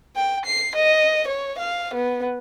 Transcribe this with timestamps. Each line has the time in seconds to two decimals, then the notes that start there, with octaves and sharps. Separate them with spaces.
0.16 G5
0.45 C7
0.75 D#5
1.28 C#5
1.58 F5
1.94 B3